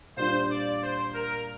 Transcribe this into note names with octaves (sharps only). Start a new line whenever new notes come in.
A#2 G3 D4 F4 C5
D5
C5
A#4